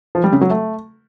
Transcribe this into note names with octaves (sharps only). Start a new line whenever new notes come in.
F3
G3
C#3
F#3
A3